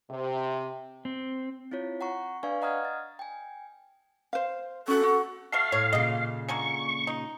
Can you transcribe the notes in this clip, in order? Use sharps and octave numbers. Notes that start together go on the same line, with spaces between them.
C3
C4
C4 E4 F4 C#5
F#5 A#5 C#6
D4 B4 D5 F5 G#5 C#6
D#5 F#5 A#5 D#6 F6 G#6
A6
G5 G#5
C5 F5
C#4 F#4 A4
F#4 F#5
A3 F#4 A4 F5
A2 C#5
A#2 C#3 D#5
D3 G#3 A#3 C#6
D#4